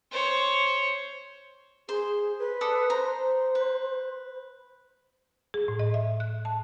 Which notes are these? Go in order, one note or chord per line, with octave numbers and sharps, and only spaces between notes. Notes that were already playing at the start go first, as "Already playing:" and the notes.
C5 C#5
G#4 C5
B4
A4 D5 D#6
C5 A#5
B4
G#4
A2
D#5
E5
F#6
A5